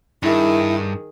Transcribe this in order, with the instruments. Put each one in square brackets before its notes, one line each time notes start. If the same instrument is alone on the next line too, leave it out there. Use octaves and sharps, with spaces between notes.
[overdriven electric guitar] G2 [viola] D#3 G#4 [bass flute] E4